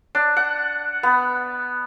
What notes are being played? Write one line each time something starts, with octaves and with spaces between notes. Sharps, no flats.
D4
F#5
B3